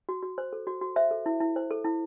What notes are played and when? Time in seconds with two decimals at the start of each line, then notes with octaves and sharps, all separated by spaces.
0.09 F#4
0.23 F#4
0.38 C5
0.53 A4
0.67 F#4
0.81 F#4
0.96 C5 E5
1.11 A4
1.26 E4
1.40 E4
1.56 C5
1.71 A4
1.85 E4